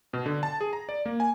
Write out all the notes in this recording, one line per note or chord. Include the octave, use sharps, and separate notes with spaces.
B2
D3
A5
G#4
A#5
D5
A#3
G#5